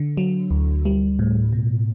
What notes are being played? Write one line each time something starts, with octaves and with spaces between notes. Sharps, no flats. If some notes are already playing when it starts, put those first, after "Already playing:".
Already playing: D3
F#3
D2
G3
A2
B2